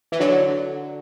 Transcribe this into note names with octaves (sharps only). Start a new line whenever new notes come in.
E3
D3 F#3